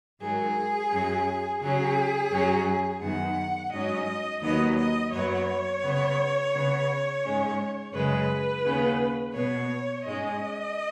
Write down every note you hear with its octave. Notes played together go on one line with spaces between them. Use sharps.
G#2 D#3 F#3 G#4
F#2 F#3 C#4
C#3 F#3 C#4 G#4
F#2 F#3 C#4
F#2 D#3 B3 F#5
G#2 F#3 C#4 D#5
D#2 D#3 F#3 B3 D#5
D#5
F#2 F#3 B3 C#5
C#3 B3
C#3 B3
G#2 G#3 C#4
F#2 C#3 G#3 B4
D#2 C#3 B3
B2 B3 C#5
G#2 G#3 C#4 D#5